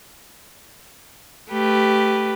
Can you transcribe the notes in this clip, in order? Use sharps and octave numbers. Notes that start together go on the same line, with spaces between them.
A3 G4 B4